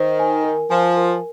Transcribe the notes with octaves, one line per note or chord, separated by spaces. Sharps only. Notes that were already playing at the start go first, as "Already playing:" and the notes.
Already playing: D#3 C5
G#5
A#4
F3 G#5
A#4